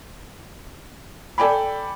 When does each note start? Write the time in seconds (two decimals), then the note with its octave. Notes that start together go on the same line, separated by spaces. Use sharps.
1.38 A4 D5 G5 G#5 B5